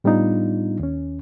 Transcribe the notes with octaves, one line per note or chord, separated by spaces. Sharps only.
A2 G3 B3 D4 D#4 F4
D#2 C#4